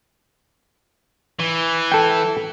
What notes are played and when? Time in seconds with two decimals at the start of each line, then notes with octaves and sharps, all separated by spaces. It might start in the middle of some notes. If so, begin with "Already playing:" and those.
1.40 E3
1.92 A4 G5